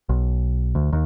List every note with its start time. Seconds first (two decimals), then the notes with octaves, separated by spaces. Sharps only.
0.09 B1
0.75 D2
0.93 D#2